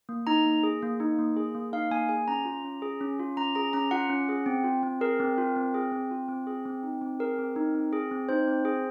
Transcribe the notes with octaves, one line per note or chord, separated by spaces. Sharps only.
A#3
D#4 A#5
A#3
G#4
A#3
D#4
A#3
G#4
A#3
D#4 F5
A#3 G#5
G#4 G#5
C#4 A#5
F4
C#4
G#4
C#4
F4
C#4 A#5
G#4 A#5
C#4 A#5
F4 F#5
C#4
G#4
C4
F4
C4
G#4 A#4
C4
F4
C4
G#4
C4
F4
C4
G#4
C4
D#4
C4
G#4 A#4
C4
D#4
C4
G#4
C4
D#4 C5
C4
G#4